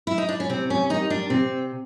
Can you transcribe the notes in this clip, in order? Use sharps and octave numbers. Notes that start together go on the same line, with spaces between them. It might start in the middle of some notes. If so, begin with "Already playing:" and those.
E4
D#4
D4
C#4
C3 C4
C#4
D#3 G3 D#4
D4
C3 C4